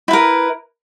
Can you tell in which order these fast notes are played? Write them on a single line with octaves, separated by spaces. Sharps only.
E4 B4 A#4